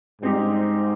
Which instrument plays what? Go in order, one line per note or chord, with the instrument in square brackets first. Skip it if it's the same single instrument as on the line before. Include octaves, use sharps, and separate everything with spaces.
[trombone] G#2 [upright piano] G3 C4 D#4 G4